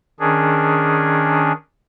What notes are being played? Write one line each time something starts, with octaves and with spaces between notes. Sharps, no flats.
D#3 C#4 D4 G#4